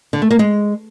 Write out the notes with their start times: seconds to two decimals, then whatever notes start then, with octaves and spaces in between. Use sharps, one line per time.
0.13 D3
0.22 A3
0.31 A#3
0.39 G#3